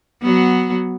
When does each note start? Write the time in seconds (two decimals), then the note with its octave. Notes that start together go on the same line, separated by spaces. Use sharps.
0.22 F#3 B3